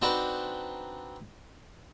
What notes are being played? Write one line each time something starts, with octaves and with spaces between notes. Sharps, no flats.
C4 D4 D#4 F#4 B4 C5